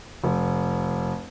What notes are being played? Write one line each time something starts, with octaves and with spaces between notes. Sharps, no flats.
F1